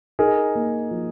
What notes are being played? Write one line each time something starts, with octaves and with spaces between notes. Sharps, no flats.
D#4 G#4 A#4
A#3
F3